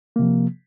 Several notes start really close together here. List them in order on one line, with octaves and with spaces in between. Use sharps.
A#3 C3 F3